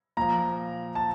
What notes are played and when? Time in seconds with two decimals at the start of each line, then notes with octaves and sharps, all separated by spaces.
0.17 A#2 F3 A#5
0.95 A5